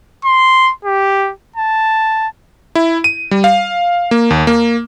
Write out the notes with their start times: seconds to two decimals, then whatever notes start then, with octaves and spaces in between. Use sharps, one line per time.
0.25 C6
0.85 G4
1.56 A5
2.75 E4
3.04 D#7
3.31 G3
3.44 F5
4.11 A#3
4.30 D#2
4.47 A#3